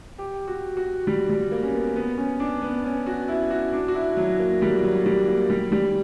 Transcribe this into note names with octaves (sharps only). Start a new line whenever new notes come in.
G4
F#4
F#4
G3
G3
A#3
C#4
B3
B3
C#4
D4
B3
C#4
F#4
E4
F#4
D4
F#4
E4
F#3
A#3
G3
F#3
G3
A#3
G3
G3